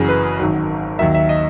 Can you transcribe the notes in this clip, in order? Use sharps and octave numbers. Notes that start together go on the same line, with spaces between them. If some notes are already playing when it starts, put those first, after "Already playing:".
Already playing: F#1 F#2 C#3 E3 G#4
B4
G#1 G#2 D#3 F#3
D#2 D#3 F#3 E5
E5
D#5